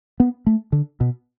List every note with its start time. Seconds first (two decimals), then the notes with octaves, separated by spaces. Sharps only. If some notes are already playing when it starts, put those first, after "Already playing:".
0.20 B3
0.46 A3
0.72 D3
1.01 B2